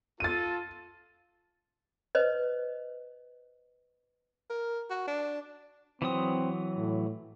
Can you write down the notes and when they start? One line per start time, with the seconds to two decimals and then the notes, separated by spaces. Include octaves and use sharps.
0.20 F4 A4 A6 D#7
2.15 B4 C5 D#5
4.50 A#4
4.90 F#4
5.08 D4
6.02 E3 F#3 C4 D#6
6.77 A2